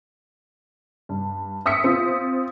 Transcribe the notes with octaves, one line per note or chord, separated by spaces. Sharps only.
G2
E5 D#6 E6 B6 C#7
C4 F4